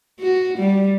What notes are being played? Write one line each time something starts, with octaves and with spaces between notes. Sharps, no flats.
F#4
G3